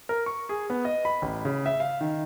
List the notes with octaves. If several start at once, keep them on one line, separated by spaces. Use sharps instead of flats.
A#4
C#6
G#4
B3
D#5
B5
A1
C#3
E5
F5
D#3